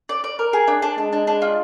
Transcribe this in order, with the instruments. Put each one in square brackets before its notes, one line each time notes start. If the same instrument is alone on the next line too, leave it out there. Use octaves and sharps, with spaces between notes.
[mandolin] D5
D5
A#4
G#4
D4
D4
[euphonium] G#3 [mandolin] D4
[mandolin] D4
D4
F4